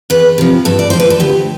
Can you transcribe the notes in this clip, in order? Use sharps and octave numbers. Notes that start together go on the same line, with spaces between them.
E2 B4
C3 F3
G2 A4
D5
F3 C5
B4
A4
D2 G4